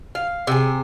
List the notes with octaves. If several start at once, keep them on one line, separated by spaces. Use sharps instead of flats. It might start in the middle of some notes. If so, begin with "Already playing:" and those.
F5
C3 G#4